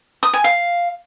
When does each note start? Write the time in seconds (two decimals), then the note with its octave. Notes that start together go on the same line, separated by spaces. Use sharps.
0.23 D#6
0.34 G#5
0.44 F5